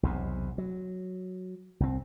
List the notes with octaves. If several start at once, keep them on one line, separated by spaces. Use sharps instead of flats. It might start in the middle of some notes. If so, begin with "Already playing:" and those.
B1 E2 C3
F#3
C2 C4